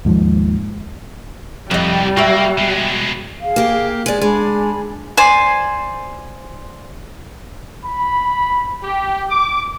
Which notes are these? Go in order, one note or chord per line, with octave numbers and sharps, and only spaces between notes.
D#2 G#2 F3
C2 F2 G3 D#5
A#3 F#4 E5
B2 G#3
G#4 F5
A#3 G4
G#3 G#4 D5
G#3 D4 G#5 B5
C5 D5 G#5
B5
G4
D6